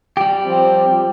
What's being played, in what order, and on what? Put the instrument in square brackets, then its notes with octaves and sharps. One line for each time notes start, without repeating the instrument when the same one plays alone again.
[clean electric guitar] G3 G4
[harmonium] F3 C4